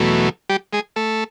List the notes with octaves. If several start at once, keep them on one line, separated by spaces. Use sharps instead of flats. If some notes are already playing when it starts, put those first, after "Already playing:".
Already playing: E2 B2 F#3 A3
G3 G4
G#3 G#4
A3 A4